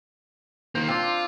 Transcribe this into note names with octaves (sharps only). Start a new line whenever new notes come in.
D#3 A#3 C5
C4 D4 F4